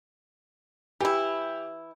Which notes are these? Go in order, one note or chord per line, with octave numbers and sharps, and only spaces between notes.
E3 E4 G4